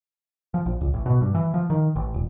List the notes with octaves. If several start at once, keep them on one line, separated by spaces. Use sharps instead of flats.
F3
A#1
C#2
A1
B2
G2
E3
F3
D#3
A1
D#1